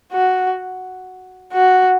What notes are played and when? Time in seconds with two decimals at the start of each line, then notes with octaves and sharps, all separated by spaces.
0.12 F#4
1.53 F#4